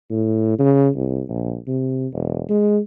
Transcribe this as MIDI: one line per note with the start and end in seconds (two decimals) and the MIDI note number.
0.11 0.55 45
0.59 0.89 49
0.96 1.23 36
1.29 1.57 34
1.68 2.07 48
2.13 2.44 28
2.49 2.79 56